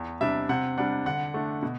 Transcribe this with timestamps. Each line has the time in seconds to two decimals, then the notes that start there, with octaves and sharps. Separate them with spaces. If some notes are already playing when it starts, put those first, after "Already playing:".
Already playing: E2
0.21 C3 G3 D4 E5
0.49 C3 F#5
0.78 G3 D4 F#5
1.06 D3 F#5
1.34 A3 D4
1.62 B2